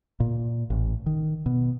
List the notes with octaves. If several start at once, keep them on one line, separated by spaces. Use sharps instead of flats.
A#2
A1
D#3
B2